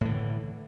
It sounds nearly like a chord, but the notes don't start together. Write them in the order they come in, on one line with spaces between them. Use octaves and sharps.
A2 E3 D3